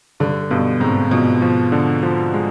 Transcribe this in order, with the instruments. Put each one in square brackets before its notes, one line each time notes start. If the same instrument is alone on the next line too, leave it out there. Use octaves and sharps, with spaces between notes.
[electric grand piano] G2 [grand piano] D3
[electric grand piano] G2 [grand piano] B2
[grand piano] G#2 [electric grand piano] C4
[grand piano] B2 [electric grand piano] F3
[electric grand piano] F3
D3
F3
G#3